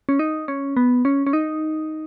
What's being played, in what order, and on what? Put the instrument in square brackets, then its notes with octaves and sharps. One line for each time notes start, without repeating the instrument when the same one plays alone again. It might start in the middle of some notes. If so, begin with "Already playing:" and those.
[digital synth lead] C#4
D#4
C#4
B3
C#4
C#4
D#4